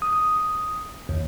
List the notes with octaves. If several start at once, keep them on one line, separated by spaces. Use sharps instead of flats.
D#6
D#2